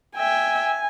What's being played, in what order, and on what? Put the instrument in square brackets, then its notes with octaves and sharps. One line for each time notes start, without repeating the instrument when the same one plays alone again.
[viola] E5 G5 [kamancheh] G#5